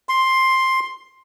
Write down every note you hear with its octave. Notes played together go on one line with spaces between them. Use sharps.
C6